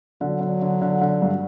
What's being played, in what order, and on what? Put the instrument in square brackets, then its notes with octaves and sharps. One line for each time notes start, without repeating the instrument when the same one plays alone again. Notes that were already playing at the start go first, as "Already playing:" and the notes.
[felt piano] D3 [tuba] F#3
[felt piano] D3
D3
D3
D3
G2